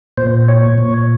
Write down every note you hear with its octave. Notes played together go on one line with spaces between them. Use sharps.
A#2 C5
C#5
A#2